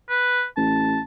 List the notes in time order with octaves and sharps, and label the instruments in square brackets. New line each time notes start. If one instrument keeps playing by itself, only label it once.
[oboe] B4
[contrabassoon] A1 [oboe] A5